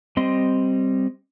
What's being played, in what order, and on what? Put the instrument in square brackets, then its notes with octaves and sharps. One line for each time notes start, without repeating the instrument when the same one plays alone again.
[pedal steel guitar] G3 C4 D#5 C6